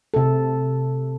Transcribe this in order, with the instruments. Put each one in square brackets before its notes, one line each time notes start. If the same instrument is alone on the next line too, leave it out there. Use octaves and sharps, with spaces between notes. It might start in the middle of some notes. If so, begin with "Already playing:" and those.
[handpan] C3 A4